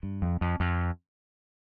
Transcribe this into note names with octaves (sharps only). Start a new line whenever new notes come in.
G2
F2
F2
F2